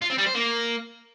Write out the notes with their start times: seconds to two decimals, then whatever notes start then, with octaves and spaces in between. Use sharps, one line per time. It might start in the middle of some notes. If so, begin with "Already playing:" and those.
0.02 F4
0.10 C4
0.18 G3
0.26 C5
0.34 A#3